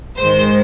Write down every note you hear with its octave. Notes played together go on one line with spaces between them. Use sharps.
G#2 D#3 G#3 C5